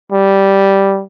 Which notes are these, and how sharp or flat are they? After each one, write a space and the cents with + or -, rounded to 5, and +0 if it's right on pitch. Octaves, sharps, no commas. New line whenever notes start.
G3 -5